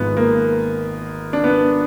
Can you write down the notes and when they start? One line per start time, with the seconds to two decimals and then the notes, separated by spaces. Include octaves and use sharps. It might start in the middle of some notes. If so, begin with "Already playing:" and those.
Already playing: G#1 G#2 F3 G#3 B3
0.17 A#3
1.33 D4
1.44 B3